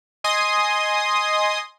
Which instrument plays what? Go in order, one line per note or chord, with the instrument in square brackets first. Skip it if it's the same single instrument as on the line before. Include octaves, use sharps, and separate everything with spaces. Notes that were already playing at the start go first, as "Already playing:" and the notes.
[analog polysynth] D#5 G#5 C6 D#6